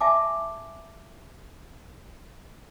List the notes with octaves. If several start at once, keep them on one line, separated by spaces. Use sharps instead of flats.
E5 G#5 A5 D6